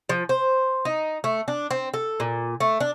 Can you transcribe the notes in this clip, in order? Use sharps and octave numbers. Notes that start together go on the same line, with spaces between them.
F3
C5
D#4
A3
D4
C4
A4
A#2
A3
D4